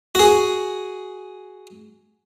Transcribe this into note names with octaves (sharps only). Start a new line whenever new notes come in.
F#4 G#4